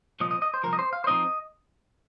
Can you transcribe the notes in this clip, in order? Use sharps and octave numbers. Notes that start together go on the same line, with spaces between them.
C2 A#2 F3 D#5
D#5
D#5
C5
C2 A#2 F3 A#4
D#5
C5
F5
C5
A#2 F3 C4 D#4 D#5